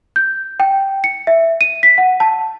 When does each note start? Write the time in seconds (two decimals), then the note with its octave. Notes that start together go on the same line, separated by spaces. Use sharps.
0.16 G6
0.60 G5
1.04 C#7
1.27 E5
1.61 D#7
1.83 B6
1.98 F#5
2.20 A5